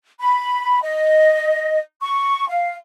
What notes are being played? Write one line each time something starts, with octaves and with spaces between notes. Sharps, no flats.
B5
D#5
C#6
F5